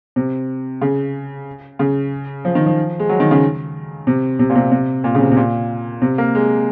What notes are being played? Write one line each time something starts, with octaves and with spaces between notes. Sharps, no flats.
C3
C#3
C#3
F3
D#3
F3
G#3
F#3
D#3
C#3
C3
C3
A#2
C3
C3
A#2
C#3
C3
C3
A#2
C3
A#3
G#3